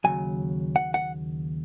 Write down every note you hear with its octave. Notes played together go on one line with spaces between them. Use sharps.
D#2 C#3 F#3 G#5
F#5
F#5